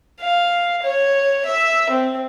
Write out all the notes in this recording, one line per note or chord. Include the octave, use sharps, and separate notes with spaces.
F5
C#5
E5
C4